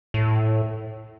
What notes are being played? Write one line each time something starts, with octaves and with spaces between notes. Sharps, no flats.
A2